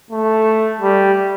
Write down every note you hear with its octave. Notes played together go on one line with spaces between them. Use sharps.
A3
G3